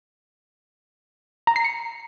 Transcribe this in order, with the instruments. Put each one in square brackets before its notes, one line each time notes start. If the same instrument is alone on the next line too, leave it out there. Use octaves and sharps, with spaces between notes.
[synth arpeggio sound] A#5
C7
C#7